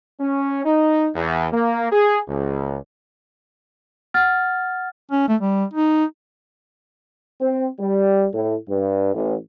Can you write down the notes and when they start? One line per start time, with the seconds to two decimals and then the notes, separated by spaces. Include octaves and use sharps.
0.21 C#4
0.65 D#4
1.15 E2
1.53 A#3
1.92 G#4
2.28 C#2
4.14 F#5 F6 A6
5.11 C#4
5.28 A3
5.41 G3
5.73 D#4
7.41 C4
7.80 G3
8.33 A2
8.68 G2
9.13 A1